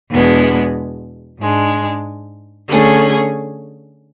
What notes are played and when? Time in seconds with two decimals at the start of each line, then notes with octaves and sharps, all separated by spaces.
0.11 E2 B2 G#3 B3 D4
1.40 G#2 G#3 D4
2.68 D3 A3 C#4 G#4